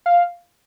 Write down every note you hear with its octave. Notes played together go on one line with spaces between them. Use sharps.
F5